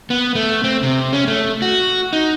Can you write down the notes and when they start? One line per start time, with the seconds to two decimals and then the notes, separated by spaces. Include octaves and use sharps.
0.10 B3
0.35 A3
0.64 C4
0.83 C3
1.12 C#4
1.28 A3
1.62 F#4
2.13 D#4